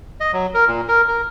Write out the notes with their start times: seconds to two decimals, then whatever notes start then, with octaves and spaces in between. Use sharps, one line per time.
0.20 D#5
0.33 F#3
0.54 A#4
0.68 A#2
0.88 A#4
1.08 A#4